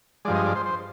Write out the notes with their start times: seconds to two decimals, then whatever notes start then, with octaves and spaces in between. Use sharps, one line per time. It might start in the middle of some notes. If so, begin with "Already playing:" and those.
0.25 G2 F3 G#3 D5
0.35 D#5
0.46 D5
0.55 C5
0.66 C5